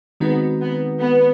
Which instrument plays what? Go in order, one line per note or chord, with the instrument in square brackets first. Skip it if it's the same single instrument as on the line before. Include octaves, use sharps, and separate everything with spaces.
[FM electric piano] D#3 G#3 C4 D#4 F#4 [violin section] B3
[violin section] B3
B3